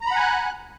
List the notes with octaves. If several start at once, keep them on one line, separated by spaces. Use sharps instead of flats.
F#5 G#5 A#5 B5 F#6